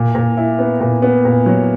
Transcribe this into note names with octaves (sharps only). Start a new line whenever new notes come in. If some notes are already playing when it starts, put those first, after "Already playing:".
Already playing: A#2
A#2
E4
B3
A#2
B3
A#2
F#3